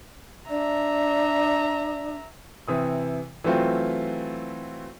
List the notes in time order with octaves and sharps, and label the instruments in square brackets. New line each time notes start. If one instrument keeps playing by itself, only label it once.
[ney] D4 [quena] D5 [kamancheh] E5 A#5
[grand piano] C3 E3 D#6
E3 F#3 A3 C4 F4